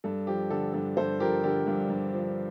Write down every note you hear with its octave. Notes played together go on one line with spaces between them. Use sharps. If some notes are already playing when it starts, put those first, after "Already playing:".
G2 A4
F3 G4
D3 A4
G2 A4
G2 A4 C5
F3 G4 A#4
D3 G4 A#4
G2
G2
F3